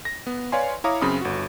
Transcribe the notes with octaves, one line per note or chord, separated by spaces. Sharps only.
A#6
B3
B4 C#5 D5 F5 G#5 C6
E4 C#5 F5 A#5 D6 D#6
F#2 C#3 C4 B5 D#6
G1 F#4